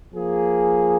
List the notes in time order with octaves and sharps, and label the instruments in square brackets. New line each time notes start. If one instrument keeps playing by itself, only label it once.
[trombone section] F3 A#3 G#4